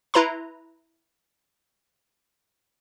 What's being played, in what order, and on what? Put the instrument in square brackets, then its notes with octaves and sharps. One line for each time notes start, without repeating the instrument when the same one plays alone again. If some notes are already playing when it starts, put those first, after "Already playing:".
[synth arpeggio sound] E4 B4 A#5 C6